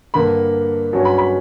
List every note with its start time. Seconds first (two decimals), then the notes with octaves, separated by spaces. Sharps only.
0.14 G2 D3 A#3 B5
0.93 G2 F#3 C#4
1.05 B5
1.18 B5